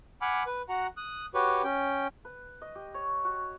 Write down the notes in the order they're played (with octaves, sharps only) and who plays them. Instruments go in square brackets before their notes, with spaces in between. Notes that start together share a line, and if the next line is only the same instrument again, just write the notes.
[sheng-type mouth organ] F#5 G#5 B5 D6 F6
B4
F#4 F#5 A#5
D#6 F#6
F#4 G4 B4 C#5
C#4 G5
[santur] B4
D#5
G4
C#5
F#4